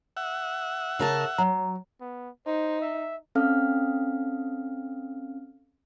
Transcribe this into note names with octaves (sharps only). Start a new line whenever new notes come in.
E5 F#5
C#3 A#4 A5
F#3 A#5
B3
D#4 C5
E5
C4 C#4 A4 F5 F6